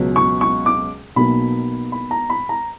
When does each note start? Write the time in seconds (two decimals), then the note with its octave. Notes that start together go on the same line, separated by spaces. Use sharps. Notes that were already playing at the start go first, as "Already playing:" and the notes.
Already playing: C#2 B2 F#3 C#4
0.16 C#6
0.41 C#6
0.66 D6
1.16 B1 B2 A#3 B5
1.92 B5
2.11 A#5
2.30 B5
2.49 A#5